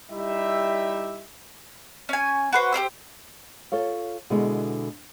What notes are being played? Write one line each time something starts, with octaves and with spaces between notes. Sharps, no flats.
G3 D#4 E4 G4 E5
C#4 G#5
F#4 B4 C5
G4 A#4 C5 E6
F4 A4 C#5 F5
B2 D3 G#3 E4